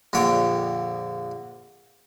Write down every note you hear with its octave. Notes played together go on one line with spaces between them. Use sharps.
A#1 F2 D3 C#5 G5